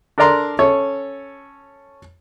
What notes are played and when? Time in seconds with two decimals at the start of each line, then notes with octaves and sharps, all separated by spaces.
0.18 D4 A4 A#4 D5 A#5 C6
0.59 C#4 A4 C#5